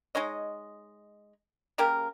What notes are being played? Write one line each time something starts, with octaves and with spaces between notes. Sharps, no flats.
G#3 D#4 C#5 D#5
C#3 A#3 G4 A#4